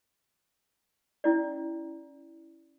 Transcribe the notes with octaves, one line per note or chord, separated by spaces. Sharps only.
C#4 E4 D5